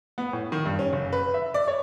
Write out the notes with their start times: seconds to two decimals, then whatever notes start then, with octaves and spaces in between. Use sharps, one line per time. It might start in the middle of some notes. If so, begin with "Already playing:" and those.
0.18 B3
0.33 A2
0.52 D#3
0.66 G2
0.79 C#4
0.93 F#1
1.13 B4
1.34 E5
1.54 D5
1.68 C#5